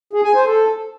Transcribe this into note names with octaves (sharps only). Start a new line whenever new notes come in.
G#4
G#5
C5
A4